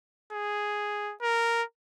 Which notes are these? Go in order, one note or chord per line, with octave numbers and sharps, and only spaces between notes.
G#4
A#4